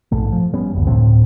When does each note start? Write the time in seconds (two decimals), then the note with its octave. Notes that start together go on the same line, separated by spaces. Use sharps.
0.12 A#1 G#2 A3
0.32 F3
0.53 G3 B3 C#4
0.73 F#1 D2
0.87 D2 A2 F3 C4